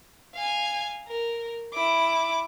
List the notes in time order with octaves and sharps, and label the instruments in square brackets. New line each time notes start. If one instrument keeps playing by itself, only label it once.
[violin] F5 G#5
A#4
E4 D6